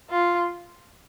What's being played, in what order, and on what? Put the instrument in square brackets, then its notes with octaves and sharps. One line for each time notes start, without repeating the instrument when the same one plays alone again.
[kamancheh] F4